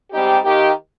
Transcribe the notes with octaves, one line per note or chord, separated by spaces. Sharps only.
G#2 G3 C4 D#4 G4
D#3 A#3 D#4 G4